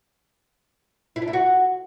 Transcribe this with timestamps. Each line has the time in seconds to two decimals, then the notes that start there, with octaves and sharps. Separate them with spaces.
1.16 E4
1.22 D4
1.28 E4
1.33 F#4